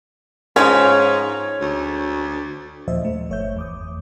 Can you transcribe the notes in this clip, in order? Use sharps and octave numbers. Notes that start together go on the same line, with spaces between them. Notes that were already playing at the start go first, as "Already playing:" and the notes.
G#2 F3 G#3 C#4 C#5
D2
D#2 A#2 F3 C5 D#5 E5
A3
G1 A3 C#5 E5 G6
E2 D6 D#6